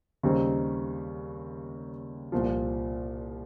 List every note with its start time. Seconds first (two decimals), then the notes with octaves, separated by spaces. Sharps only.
0.23 D#2 C#3 G3 C4 D#4
2.32 C2 A#2 F3